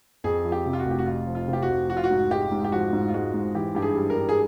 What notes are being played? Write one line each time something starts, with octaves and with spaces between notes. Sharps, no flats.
F2 G#4
F3
G4
C3
F4
F#4
F1
G4
F#4
F2 F4
F3
F4
C3
G4
F#4
F1
F3 F#4
F4
F#4
G#2
G#3 G4
G#2
G4
F3 F#4
G#2
F4
G#3 F#4
G#2
E3 G4
G2 G4
G#4
G3
A#4
G2
G#4